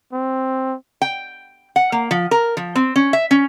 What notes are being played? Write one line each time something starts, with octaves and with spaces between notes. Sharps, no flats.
C4
G5
F#5
A#3
F3
A#4
F3
C4
C#4
E5
C#4